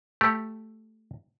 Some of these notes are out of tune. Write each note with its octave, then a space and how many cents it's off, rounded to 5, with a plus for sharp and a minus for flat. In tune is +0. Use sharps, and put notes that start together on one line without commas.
A3 +0 G4 +0